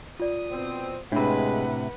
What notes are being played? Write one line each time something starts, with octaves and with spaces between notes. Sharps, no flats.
F4 D5 D#6
B2 C4
A2 C3 G#3 D4 B4 F#5 B5